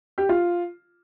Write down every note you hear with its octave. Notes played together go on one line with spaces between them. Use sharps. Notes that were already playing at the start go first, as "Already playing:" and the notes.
G4
F4